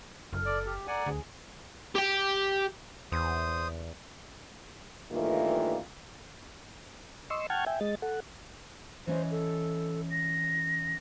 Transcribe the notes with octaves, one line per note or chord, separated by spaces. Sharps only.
F#1 A4 F6
D5
G4
A4 D5 F#5 G#5 A#5
D2 G#4
G4 G5
E2 C5 D#6
G2 D#3 E3 A3 A#3 F4
D#5 C6 C#6 E6
F#5 G5 A5 C#6 F6 G#6
E5 G5 G#5
G#3 D#5 A6
A4 F#5
E3 C#4 C5 D#5
A4
A#6